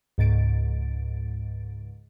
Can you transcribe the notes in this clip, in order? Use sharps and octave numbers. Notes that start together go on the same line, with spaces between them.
C#2 G#2 A6 D7